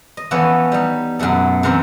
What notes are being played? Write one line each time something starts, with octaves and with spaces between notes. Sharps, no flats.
D#5
E3 F3 B3 C#4 A4 C#5
G3 D#4
F#2 B2 A3 A4
C3 E3 A4 A#4 C5 C6